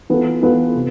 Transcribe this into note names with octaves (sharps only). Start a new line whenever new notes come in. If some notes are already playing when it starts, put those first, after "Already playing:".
E3 B3 F4 A4
E3 B3 F4 A4
C3